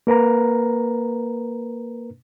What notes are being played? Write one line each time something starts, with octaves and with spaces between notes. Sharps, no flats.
A#3 A#4 B4 A#5